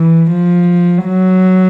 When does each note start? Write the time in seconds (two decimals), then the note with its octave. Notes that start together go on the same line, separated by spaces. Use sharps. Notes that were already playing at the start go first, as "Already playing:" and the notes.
Already playing: E3
0.31 F3
1.05 F#3